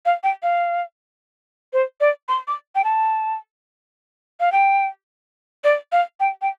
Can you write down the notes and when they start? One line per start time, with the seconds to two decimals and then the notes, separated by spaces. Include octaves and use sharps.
0.06 F5
0.23 G5
0.43 F5
1.73 C5
2.01 D5
2.28 C6
2.47 D6
2.75 G5
2.84 A5
4.40 F5
4.52 G5
5.64 D5
5.92 F5
6.20 G5
6.42 G5